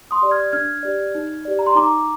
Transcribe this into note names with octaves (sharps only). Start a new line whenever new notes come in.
C6 D#6
G4 D5
F6 G#6
D4 F6 G#6
G4 D5
D#4
G4 D5
A#5
C6
D#4 A#5 D6